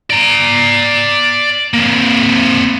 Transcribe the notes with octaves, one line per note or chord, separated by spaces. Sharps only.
D5 A#5
A#3 C4